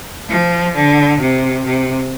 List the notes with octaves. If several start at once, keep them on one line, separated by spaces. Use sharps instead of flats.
F3
D3
C3
C3